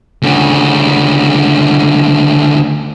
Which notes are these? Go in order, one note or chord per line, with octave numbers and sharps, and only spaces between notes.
D2 C#3